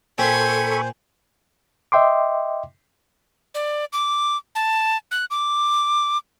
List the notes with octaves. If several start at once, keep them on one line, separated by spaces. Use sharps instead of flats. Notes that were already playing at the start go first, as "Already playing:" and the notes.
A#2 A4 C5 G5 G#5 B5 C#6
D#5 E5 G5 C6 D6
D5
D6
A5
F#6
D6